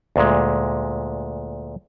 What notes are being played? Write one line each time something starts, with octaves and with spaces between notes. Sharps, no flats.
D2 A#2 G#3